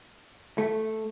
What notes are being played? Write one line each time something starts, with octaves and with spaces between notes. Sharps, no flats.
A3